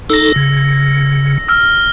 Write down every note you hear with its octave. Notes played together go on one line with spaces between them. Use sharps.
D#4 A4 E6 A#6
C#3
E6 F6